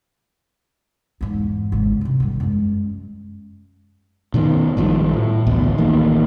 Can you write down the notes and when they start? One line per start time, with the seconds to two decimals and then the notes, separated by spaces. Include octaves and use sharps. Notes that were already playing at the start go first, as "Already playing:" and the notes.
1.21 E2 G#2
1.72 G#1 C#3
2.01 G2 C3
2.20 D#3 G3
2.40 F#2 G#3
4.34 B2 D#3 A3
4.77 G#1 D#3 F3 G3
5.13 A2
5.47 A1 D2 B2
5.78 A1 D#3 A3 A#3